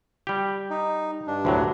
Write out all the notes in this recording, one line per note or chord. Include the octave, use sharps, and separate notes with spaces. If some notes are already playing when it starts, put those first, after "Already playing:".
G3 G4
D#4
G2 D4
D2 A2 F#3